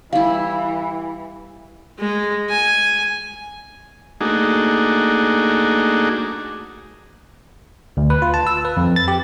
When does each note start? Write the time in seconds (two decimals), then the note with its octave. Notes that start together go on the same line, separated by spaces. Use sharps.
0.13 E3 G3 E4 F5
1.99 G#3
2.49 G#5
4.21 A3 A#3 D4 D#4 F#4 G#4
7.97 D2
8.10 B4
8.22 F4
8.34 A5
8.47 E6
8.65 B4
8.77 F2
8.96 A6
9.08 G4